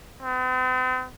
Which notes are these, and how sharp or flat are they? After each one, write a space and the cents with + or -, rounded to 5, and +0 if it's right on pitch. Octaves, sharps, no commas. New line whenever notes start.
C4 -45